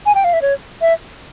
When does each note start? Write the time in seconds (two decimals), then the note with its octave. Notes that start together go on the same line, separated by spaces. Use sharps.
0.06 G#5
0.15 G5
0.24 F5
0.33 E5
0.42 C#5
0.81 E5